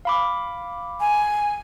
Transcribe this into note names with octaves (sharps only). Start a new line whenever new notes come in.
F5 B5 D6
G#5